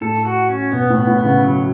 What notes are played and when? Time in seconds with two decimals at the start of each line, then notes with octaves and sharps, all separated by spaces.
0.01 A2 A4
0.25 F#4
0.49 C#4
0.72 B2 B3
0.90 A2
0.95 B3
1.07 A2
1.19 B3
1.25 C#3
1.42 F#3